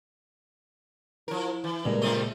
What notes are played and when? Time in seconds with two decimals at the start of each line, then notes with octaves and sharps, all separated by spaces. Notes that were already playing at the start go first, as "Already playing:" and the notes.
1.28 F3 E4 A#4
1.64 E3
1.85 C#2 G2 A#2 G#3 A#4
2.02 C3 G3 A3 F4 C6 D#6